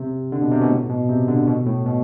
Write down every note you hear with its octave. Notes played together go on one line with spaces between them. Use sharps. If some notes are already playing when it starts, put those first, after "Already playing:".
Already playing: C3
D3
B2
C3
B2
A2
B2
C3
D3
B2
A2
B2